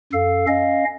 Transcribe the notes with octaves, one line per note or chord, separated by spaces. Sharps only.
F#2 A4 F5
C#4 D#5 F5